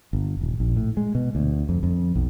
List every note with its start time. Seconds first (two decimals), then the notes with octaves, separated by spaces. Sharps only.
0.13 G1
0.41 D#1
0.60 A#1
0.76 A2
0.97 G#3
1.15 B2
1.35 D2
1.69 F2
1.83 F2
2.16 B1